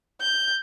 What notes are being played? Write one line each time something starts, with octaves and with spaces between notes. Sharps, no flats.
G6